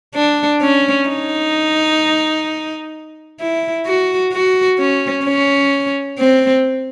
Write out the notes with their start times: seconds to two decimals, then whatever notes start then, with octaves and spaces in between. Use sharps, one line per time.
0.15 D4
0.61 C#4
1.09 D#4
3.40 E4
3.86 F#4
4.33 F#4
4.79 C#4
5.25 C#4
6.19 C4